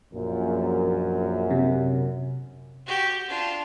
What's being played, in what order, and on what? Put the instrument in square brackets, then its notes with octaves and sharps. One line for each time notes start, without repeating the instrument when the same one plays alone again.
[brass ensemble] A#1 A#2 [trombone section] F#2
[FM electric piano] C3
[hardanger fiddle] F#4 G4
D4 F4